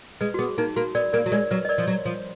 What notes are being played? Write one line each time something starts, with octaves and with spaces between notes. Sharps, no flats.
G#3 B4
F#4
B3 G#4
A#3 D#4
A#3 F#4
B3 A#4 D5
A#3 A#4 D5
F#3
G#3 A#4 D5
F#3 B4
D#5
A#4 D5
F3
F#3
F3